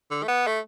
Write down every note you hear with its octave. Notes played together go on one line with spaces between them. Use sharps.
D3
A3
B3
A3